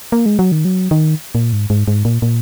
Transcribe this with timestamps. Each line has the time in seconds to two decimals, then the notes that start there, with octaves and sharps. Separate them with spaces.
0.12 A#3
0.26 G#3
0.39 F#3
0.52 D#3
0.65 F#3
0.91 D#3
1.35 A#2
1.53 G#2
1.70 G#2
1.88 G#2
2.05 A#2
2.22 A#2